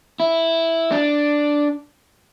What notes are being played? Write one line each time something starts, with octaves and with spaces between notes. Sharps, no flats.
E4
D4